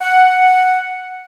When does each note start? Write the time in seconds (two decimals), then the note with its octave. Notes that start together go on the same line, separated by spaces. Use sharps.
0.01 F#5